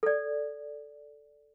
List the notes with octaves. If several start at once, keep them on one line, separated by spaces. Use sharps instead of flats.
A4 D5